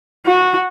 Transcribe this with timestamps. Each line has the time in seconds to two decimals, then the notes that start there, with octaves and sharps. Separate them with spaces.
0.26 F#4